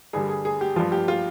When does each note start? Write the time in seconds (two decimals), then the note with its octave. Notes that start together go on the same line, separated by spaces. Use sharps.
0.13 G2 D3 G3 G#4
0.29 G#4
0.45 G#4
0.61 G4
0.76 G2 F3 F4
0.92 G4
1.08 F4